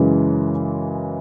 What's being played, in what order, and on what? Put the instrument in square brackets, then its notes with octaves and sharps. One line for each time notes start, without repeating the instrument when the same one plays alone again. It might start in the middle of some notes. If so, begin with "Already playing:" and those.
Already playing: [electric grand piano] F#2 C#3 E3 G#3